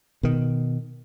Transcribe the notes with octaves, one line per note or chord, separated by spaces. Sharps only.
B2 D#3